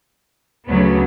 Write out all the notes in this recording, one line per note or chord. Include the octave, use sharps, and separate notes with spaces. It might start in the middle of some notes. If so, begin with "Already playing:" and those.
D2 C#3 F#3 B3